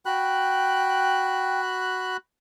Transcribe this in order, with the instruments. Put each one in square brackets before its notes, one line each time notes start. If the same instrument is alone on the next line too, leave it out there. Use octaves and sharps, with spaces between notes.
[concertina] F#4 B5 F#6 [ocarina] G5